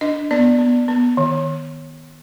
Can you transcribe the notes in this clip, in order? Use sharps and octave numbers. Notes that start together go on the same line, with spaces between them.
D4 D#5
B3 D5
B3
B3
D#3